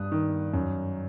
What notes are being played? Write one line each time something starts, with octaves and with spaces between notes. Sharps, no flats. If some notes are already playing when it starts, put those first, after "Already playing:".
Already playing: G2 D#6 F#6
D#3
F#2